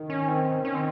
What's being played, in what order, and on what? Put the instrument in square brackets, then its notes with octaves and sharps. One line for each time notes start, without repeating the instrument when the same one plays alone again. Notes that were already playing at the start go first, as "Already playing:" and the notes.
Already playing: [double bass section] D#3
[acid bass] C#4
C4
C#4
C4